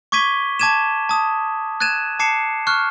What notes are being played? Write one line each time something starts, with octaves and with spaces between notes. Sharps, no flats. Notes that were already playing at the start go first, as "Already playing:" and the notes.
C#6 D6 G#6 B6 D#7 G7
A5 D6 G#6 D#7 E7
A5 D#6
F#6 G#6 A6 D#7 E7
A5 D6 C7 C#7 E7
C#6 F6 F#6